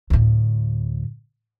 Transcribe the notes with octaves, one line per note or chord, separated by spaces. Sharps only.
D2 A2